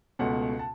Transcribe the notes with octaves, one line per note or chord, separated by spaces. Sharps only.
C#2 B2 A3 F#5
A5